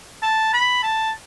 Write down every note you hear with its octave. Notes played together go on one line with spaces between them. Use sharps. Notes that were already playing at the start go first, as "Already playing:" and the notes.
A5
B5
A5